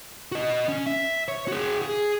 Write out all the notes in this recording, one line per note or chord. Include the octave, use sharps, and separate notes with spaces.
F#4 D#5
C#4
E5
C#5
F#4 G#4
G#4